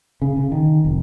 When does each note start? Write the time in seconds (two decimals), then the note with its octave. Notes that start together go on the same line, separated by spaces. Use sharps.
0.22 C#3
0.37 C#3
0.52 D#3
0.85 F1